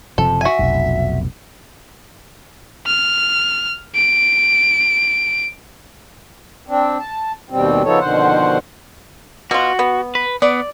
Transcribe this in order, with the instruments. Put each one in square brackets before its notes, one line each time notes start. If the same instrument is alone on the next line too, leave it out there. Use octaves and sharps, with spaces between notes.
[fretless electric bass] F#1 C3 F3 [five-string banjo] A4
[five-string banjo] F#4 G#5 [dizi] E5
[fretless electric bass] F1 B1
[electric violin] F6
D7
[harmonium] C4 D4
A5
D#2 B2 G3 C4
C#3 F3 B3 D#4 A4 C#5
F2 B2 D3 D#3 C5 F#5
[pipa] B2 F4 [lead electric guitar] F#4
[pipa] B3
[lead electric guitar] B4
[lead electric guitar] B3 [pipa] D5